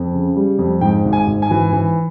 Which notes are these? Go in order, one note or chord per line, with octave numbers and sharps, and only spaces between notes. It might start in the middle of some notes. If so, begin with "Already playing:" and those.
Already playing: F2
C#3
G3
F2
G#2 G5
G#1
G#5
G#1
G#5
E3
E3